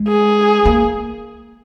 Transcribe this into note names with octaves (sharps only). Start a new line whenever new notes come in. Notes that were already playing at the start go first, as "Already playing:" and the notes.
Already playing: G#3
G#4
A#3